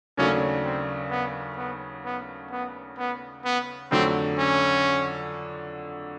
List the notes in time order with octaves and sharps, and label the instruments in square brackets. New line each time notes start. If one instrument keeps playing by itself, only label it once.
[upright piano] D#2 C#3 F#3 A3 D4 [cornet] C#4
[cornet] C4
B3
B3
B3
B3
B3
B3
[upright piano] F2 D3 F#3 A3 [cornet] C4
[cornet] C#4